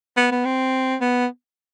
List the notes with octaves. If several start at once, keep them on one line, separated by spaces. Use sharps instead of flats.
B3
B3
C4
B3